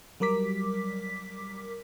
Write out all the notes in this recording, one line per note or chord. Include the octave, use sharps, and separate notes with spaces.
F#3 G3 A#4 D6 B6